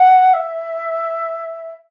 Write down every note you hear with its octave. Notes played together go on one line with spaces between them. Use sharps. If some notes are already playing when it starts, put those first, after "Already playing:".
Already playing: F#5
E5